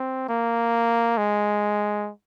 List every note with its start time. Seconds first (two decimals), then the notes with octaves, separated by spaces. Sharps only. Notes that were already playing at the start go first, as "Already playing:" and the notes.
Already playing: C4
0.29 A#3
1.18 G#3